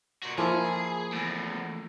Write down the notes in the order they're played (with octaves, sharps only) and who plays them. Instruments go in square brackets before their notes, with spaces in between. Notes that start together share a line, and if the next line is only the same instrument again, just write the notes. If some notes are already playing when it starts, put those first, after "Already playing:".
[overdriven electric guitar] A#2 F#4
[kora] F3 A#3 E4 [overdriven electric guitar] G#4
[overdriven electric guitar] E2 A2